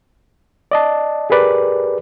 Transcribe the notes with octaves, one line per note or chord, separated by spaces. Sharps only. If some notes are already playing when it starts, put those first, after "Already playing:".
D5 D#5 A5
G4 G#4 A#4 B4 D5